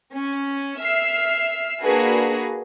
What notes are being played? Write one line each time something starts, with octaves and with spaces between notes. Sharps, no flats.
C#4
E5 E6 F6 C7
A#3 D4 F#4 G#4 B4